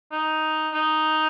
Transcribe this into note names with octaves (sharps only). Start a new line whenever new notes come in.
D#4
D#4